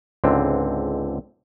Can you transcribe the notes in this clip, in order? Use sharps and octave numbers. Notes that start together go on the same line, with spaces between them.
C#2 G#2 D3 C4